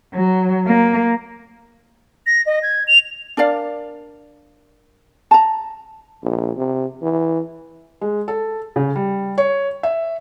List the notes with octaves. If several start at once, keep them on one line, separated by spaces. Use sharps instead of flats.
F#3
A#3
A#6
D#5
G#6
F7
D4 A#4 D5 F5
A5 A#5
A#1
C3
E3
G#3
A4
C#3
G3
C#5
E5